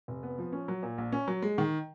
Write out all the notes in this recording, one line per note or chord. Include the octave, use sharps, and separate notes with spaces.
F1
B3
F3
C#4
F#3
A#2
A#1
C#4
F#3
G#3
D#3